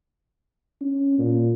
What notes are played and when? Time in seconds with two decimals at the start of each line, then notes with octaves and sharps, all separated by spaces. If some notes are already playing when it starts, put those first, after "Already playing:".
0.81 C#4
1.18 A#2